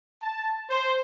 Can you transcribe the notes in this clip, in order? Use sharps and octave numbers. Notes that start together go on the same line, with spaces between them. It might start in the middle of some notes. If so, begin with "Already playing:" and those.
A5
C5